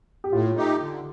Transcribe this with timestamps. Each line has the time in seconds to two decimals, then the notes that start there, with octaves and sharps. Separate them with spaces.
0.24 G4
0.32 A2 F4
0.56 A3 D#4 G4
0.81 D3